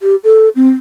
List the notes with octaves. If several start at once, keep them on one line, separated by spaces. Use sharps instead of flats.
G4
A4
C4